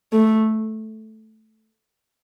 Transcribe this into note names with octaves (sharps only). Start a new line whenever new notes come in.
A3